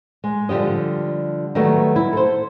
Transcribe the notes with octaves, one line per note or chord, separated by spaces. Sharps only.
G#3
D3 F3 G3 G4 D#5
D#3 F#3 G3 A3 B3
E4
A4 C5